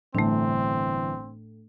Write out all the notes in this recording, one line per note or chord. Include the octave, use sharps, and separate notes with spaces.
G1 A2 E3 A3 C4 D4